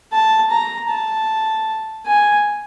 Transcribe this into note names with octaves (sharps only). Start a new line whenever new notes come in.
A5
A#5
A5
G#5